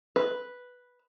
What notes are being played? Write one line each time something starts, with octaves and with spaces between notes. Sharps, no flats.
B4